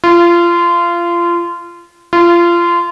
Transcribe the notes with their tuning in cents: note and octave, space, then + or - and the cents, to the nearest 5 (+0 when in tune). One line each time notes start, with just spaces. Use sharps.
F4 -25
F4 -25